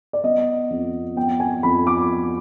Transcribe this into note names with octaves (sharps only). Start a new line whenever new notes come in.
D5
B3 D#5
F2
B3 G5
G#5
F2 B5
D6